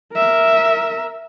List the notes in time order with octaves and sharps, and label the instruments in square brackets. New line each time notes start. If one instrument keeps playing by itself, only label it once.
[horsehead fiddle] A#4 E5